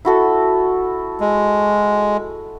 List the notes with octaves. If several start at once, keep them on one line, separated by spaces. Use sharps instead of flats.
E4 F#4 A4
G#3